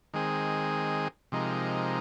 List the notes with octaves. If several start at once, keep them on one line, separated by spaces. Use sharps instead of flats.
D#3 G#3 C4 G#4
C3 F3 G#3 D#4 A#4